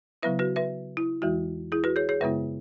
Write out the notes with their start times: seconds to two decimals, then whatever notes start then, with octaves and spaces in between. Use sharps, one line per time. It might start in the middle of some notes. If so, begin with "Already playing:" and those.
0.23 C#3 F#3 B3 E4 B4 E5
0.39 F#4 B4
0.56 B4 E5
0.97 E4
1.22 E2 E3 G#3 E4 F#4
1.72 E4 G#4
1.84 F#4 B4
1.96 G#4 C#5
2.09 G#4 C#5
2.21 F#2 C#3 G#3 B3 E4 B4 E5